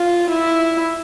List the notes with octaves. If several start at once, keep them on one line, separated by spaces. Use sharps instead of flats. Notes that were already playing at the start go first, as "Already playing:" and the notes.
Already playing: F4
E4